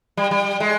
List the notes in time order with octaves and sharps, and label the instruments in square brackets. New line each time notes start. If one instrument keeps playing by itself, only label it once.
[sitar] G3
G3
G#3